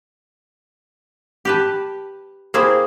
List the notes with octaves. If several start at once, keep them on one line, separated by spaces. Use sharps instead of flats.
G4 B4 A5
A#3 C4 E4 G#4 C5